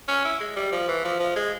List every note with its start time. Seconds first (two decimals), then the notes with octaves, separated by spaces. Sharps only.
0.08 C#4
0.25 E4
0.40 G#3
0.56 G3
0.72 F3
0.88 E3
1.05 F3
1.20 F3
1.36 G#3